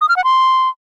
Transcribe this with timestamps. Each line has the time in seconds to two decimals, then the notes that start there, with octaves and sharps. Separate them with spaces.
0.01 D#6
0.09 F6
0.16 F#5
0.24 C6